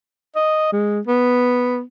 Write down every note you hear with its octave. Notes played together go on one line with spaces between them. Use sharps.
D#5
G#3
B3